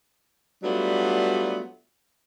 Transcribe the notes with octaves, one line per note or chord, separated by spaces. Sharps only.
F#3 G3 A3 B3 D4 F4